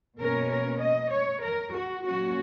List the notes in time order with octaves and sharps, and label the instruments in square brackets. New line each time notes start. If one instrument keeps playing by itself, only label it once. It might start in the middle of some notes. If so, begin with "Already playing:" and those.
[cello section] B2 A#3 C#4 A#4
A#4
D#5
C#5
A#4
F#4
A#2 F#3 A#3 C#4 F#4